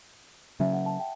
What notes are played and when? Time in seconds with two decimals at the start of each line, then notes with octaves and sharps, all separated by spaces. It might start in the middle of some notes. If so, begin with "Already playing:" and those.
0.60 C#3 F#3 C#4 E5
0.73 F#5
0.86 A5
1.00 G5